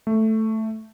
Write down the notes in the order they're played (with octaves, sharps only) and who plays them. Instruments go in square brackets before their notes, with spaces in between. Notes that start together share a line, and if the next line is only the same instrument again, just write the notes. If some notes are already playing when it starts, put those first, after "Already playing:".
[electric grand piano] A3